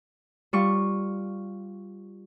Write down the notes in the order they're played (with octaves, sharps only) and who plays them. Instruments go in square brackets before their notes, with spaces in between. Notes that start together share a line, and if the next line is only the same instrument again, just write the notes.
[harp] G3 F4 C#6